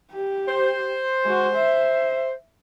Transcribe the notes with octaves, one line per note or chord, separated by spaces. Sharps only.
G4
C5
G#3 F#4
E5